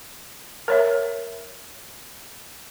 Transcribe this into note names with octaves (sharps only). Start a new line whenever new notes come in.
A#4 C#5 E5